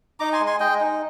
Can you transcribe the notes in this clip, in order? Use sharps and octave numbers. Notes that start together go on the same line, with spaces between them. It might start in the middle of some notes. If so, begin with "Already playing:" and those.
D#4 A#5 D6
G#5 C6
G#3
G#5 C6
G#3 D#5 G5
D#4